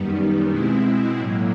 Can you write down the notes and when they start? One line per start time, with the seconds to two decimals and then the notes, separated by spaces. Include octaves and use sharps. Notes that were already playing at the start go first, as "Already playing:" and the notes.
Already playing: F#2 D#3 G3 B3
0.49 B2 G#3 C4 E4
1.18 A2 F#3 A#3